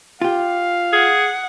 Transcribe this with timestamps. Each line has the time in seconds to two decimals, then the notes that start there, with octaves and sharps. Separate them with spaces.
0.21 F4 G4 F5
0.93 G#4 F#5